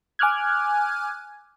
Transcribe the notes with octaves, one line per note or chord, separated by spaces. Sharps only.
G#5 D6 F6 F#6 G#6